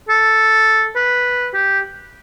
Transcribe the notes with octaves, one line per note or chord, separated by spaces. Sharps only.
A4
B4
G4